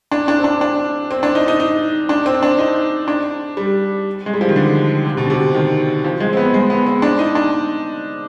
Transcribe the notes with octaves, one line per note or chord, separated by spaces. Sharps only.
D4
D4
C4
D4
D4
C4
D4
D#4
D#4
D#4
D4
C4
D4
D#4
D4
G3
G#3
G3
F3
D#3
D3
C3
B2
D3
C3
D#3
F3
G#3
C4
B3
G#3
B3
C4
D4
D#4
D4